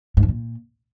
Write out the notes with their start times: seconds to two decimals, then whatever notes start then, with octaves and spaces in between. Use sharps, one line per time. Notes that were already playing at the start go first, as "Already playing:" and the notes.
0.17 G#2
0.23 F2
0.29 A#2